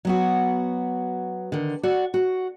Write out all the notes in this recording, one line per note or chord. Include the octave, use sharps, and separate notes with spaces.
F#3 B3 F#4
D3 D#3
F#4 D5 F#5
F#4